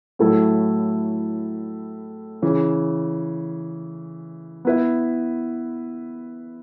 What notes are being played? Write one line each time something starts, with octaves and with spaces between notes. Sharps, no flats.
A2 F#3 A3 E4 A4
C#3 E3 C#4
B3 E4 B4 E5